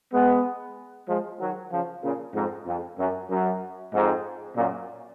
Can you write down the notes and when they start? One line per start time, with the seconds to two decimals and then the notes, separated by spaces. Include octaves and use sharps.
0.13 G#3 B3
1.08 F3 G#3
1.41 D#3 F#3
1.72 C#3 F3
2.03 A#2 C#3
2.35 F2 G#2
2.67 F2
2.99 F#2
3.30 F#2
3.93 F2 G#2
4.56 F#2 A#2